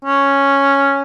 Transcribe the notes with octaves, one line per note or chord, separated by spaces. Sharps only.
C#4